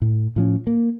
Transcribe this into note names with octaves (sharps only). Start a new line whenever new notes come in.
A2
A2 F3 C#4
A#3